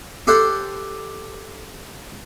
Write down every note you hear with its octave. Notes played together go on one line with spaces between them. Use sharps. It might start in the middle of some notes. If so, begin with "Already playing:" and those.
G4 A4 C5 F#5